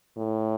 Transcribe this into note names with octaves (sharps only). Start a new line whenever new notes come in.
A2